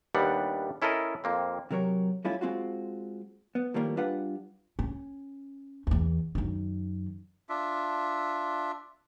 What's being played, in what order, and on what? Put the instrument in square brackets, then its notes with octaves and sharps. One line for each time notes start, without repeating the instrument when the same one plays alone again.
[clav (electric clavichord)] D#2 G3 B3 D4 F#5
C#4 E4 A4 A#4 D#5
F2 A#3 C4
[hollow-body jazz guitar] C3 F#3 A#4 C#5
G3 A3 C#4 E4 F4
G#3 C4 F4 F#4
B3
A2 D#3 F3 G3 A#3
G3 D4 F4 B4 F5 F#5
[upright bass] C#4
E2 E3
F#2 D#3
[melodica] D4 F4 E5